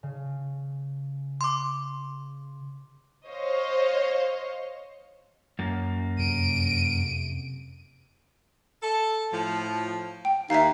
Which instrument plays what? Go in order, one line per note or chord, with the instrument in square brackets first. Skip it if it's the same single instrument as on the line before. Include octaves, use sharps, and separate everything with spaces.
[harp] C#3
[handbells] C6 D6
[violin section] C5 C#5 D#5 F5
[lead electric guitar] F#2 A#3
[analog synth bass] F2 [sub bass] C3 [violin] D7 D#7
[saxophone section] A4
A2 F3
[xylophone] G5
[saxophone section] D#2 [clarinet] D#4 [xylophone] E5 F5